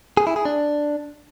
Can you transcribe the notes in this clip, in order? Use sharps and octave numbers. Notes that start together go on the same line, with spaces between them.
G#4
E4
G#4
D4